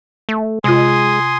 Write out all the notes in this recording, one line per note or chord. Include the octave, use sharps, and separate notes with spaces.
A3
C3 G#3 F4 G#5 C6 D#6